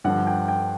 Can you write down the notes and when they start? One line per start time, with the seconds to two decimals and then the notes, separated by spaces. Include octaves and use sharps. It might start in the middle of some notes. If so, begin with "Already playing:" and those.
0.04 G2 D3 F3 F#5
0.27 G5
0.48 G5